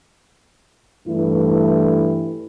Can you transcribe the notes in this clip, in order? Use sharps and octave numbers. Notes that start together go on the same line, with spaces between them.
G2 E3 A3 E4